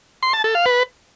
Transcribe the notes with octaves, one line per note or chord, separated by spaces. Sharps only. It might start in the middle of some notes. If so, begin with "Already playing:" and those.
C6
A5
A4
F5
B4